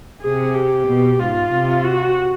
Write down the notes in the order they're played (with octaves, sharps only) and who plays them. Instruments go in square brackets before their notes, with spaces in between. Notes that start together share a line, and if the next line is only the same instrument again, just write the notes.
[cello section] C3 [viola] G#4
[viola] G4
[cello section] B2
[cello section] G#2 [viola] F4
[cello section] C3
[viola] F#4